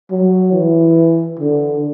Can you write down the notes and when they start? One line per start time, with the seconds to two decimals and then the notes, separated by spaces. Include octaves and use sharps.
0.10 F#3
0.53 E3
1.39 D3